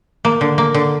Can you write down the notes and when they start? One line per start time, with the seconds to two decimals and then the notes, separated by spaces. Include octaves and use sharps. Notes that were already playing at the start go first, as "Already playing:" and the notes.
0.25 A#3
0.41 D3
0.58 A#3
0.74 D3